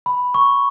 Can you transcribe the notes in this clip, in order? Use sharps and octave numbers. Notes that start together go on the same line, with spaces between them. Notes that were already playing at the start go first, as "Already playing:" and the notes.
B5
C#6